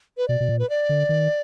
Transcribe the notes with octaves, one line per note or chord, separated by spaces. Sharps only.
B4
B2 D5
B2
A#2
B4
D5
D3
D#3